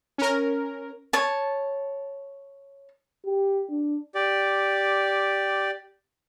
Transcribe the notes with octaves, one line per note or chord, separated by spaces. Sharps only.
C#4 A#4
C#5 A5
G4
D4
G4 D5